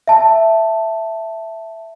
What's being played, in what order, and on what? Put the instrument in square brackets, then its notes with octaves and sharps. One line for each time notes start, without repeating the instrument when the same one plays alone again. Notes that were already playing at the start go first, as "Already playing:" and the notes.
[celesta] E5 A5